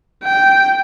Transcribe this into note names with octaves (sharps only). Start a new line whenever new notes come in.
G5